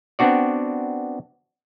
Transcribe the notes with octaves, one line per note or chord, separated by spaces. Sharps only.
B3 C4 D4 F#4 D5